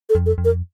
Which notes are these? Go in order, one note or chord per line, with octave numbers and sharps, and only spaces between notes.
A4
F2
A4
F2
A#4